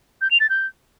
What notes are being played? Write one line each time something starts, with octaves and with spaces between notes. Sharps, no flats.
G6
F7
A6
G6